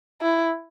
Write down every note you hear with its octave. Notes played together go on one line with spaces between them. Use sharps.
E4